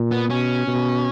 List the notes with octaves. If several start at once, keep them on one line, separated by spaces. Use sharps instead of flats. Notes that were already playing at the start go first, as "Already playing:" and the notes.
Already playing: A#2
B3
B2 C#4
B2